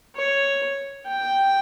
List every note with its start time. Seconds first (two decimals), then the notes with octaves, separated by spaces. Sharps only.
0.16 C#5
1.08 G5